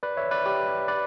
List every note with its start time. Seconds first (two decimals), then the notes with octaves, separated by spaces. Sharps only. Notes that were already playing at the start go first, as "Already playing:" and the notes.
0.03 B4 D5
0.17 C#5 E5
0.31 B4 D5
0.45 G4 B4
0.88 B4 D5